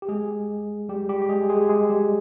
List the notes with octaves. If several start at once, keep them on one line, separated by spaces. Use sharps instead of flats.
G4
G#3 G#4
G3 G4
G3 G4
G4
G#3 G#4
G#3 G#4
G#3 G#4
G3 G4